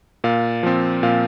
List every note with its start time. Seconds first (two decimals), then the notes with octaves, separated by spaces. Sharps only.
0.24 A#2 F5
0.63 F3 C4
1.03 A#2 F5